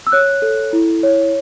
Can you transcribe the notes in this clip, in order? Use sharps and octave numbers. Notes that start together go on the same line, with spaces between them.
E6
C#5 F#6
A4
E4
C#5